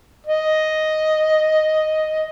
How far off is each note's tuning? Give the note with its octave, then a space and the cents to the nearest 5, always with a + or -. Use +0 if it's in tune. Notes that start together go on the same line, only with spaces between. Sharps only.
D#5 +0